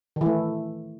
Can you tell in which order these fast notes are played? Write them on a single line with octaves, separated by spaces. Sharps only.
D#3 E3 A3